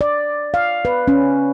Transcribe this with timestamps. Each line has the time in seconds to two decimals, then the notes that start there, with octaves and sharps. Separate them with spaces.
0.01 D5
0.54 F5
0.85 B4
1.08 C#4